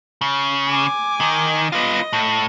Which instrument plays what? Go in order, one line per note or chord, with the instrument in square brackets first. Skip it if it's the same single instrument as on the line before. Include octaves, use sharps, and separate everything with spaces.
[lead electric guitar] C#3
[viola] G#5 D6
[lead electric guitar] D#3
[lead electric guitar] B3 F4 [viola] D#5
[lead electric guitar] A2